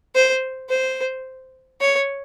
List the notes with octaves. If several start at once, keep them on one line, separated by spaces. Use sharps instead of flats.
C5
C5
C#5